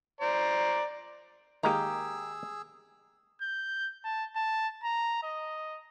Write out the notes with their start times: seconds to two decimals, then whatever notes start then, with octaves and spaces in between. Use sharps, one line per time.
0.21 C5 D5 A#5
1.63 D#3 G#3 A#3 G4 G#4 A#5 E6
3.42 G6
4.05 A5
4.36 A5
4.84 A#5
5.23 D#5